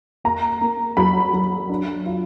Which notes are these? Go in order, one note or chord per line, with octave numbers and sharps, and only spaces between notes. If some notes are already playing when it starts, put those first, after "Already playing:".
A#3 A#5
A#3
F#3 B5
F#3
D4
F4